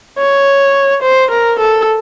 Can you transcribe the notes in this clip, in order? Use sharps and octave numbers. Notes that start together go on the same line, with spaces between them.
C#5
C5
A#4
A4